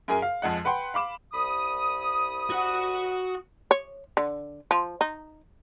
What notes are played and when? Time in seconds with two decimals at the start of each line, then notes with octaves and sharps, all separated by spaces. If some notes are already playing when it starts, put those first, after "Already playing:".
0.08 F#2 G#4 A#4 G#5
0.22 F5
0.42 F2 F3 G#3 F#5
0.65 B4 F#5 G5 C6
0.94 F5 B5 D6 E7
1.33 C2 B5 D#6
2.50 F#4 F#5
3.71 C#5
4.17 D3
4.71 F3
5.01 D#4